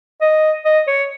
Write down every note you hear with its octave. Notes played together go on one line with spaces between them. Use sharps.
D#5
D#5
C#5